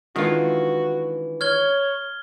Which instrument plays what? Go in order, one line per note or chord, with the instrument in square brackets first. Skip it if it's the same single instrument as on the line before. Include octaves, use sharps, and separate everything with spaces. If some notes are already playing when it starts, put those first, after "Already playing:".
[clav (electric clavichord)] D#3 F4 [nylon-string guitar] E3 G#3 D4 [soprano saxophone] F#4
[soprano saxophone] C#5 [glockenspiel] F6 G#6 G7